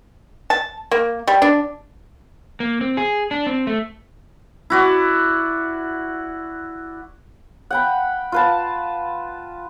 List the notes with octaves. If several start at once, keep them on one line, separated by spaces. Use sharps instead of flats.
A5
A#3
G3
D4
A#3
C4
G#4
D4
C4
A3
E4 F#4 D5
F#5 G5 B5
F4 B4 A5